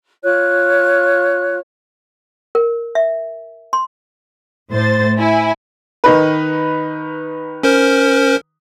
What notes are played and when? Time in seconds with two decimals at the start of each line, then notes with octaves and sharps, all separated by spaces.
0.23 F4 C#5 F#6
2.55 A#4
2.95 E5
3.73 C6
4.71 A2 C5 A6
5.17 E4 G#5
6.04 D#3 D#4 B4
7.63 C#4 A#4 C5